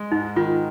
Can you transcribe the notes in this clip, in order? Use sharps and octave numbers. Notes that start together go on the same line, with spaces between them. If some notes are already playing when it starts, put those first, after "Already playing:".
Already playing: G#3
G#2 D#4
D#3 F4